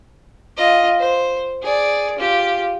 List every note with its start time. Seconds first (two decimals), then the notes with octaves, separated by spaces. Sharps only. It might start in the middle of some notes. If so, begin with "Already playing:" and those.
0.57 F4 D#5
0.99 C5
1.62 G#4 D5
2.19 F4 G4